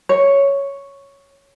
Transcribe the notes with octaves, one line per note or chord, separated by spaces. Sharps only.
C#5